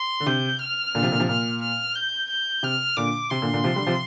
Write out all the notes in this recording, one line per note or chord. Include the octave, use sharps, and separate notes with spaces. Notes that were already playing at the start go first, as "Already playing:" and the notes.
Already playing: C6
D3
C3 G6
F6
A#2 D3
C3 F3
A#2 D3
C3 F3
A#2 F6
F6
G6
G6
C3 F6
A#2 D3 D6
C3 C6
A#2 D3
A#2 D3
C3 F3
D3 G3
C3 F3